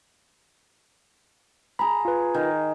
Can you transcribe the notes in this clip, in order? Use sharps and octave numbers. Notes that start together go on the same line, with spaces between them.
G#4 A#5 B5
F4 B4
D#3